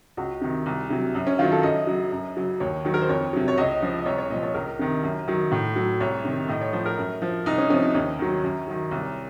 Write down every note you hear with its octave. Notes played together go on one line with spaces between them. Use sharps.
C#2 F#4
C3 D#3
C2
C3 F#3
F#2
C#4
D#3 F#3 F4
A4
F#2 D#5
C#3 F#3
F#2
C#3 F#3
D#2 C#5
D#3 F#3
A#4
C5
F2 C#5
C3 F#3
C#5
C#2 D#5
C#3 F3
D#5
C2 C#5
C#5
A#2 F3 D#5
C#5
C#2 A#4
C3 D#3
F#2
D#3 F#3
A2
F#3
C2 C#5
C3 D#3
A2 D#5
C#5
F3 C5
A#4
F#2
F3
C2 D#4
C#4
C3 F3 C#4
D#4
D#2 C#4
D#3 F#3
F#2
D#3 F#3
C2